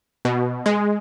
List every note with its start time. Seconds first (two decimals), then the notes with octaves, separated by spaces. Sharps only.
0.25 B2
0.66 G#3